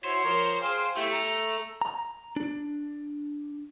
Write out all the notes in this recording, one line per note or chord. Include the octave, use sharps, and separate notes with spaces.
E4 F#4 C5 C#5
F3 A#4 C#5
G#4 F5 G5
A3 E4 G4
A#5
A#5
D4